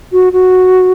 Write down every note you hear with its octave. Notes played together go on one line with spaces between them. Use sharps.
F#4
F#4